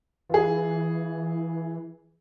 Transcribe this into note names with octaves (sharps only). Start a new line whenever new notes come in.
E3 F4 G#4